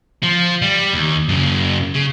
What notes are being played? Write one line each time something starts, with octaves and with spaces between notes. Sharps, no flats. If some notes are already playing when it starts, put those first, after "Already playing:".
F3
G3
D#2
F#2 C#3
C#3